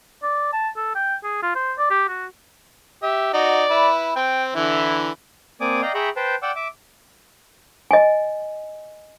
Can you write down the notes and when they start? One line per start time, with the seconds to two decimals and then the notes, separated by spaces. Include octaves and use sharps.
0.23 D5
0.53 A5
0.77 A4
0.95 G5
1.24 G#4
1.43 F4
1.55 C5
1.78 D5
1.90 G4
2.09 F#4
3.03 G4 E5
3.34 D#4 F#4 D5
3.70 E4 B4
4.16 C4 G5
4.55 D3 E3 E4
5.61 A#3 C4 D5 G#5 D6 D#6
5.82 D5 D#5 F5 G5 A#5
5.95 G#4 E5 G5 A#5 B5 C#6
6.16 B4 C5 G5 A5
6.42 D5 F#5 G5 D6 E6
6.56 E5 D6
7.91 D#5 G#5